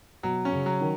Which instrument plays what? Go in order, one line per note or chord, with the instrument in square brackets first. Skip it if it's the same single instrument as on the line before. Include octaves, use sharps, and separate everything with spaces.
[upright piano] B2 [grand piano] F#3
[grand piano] C#4
[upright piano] C#3
[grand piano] F#3
[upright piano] D#3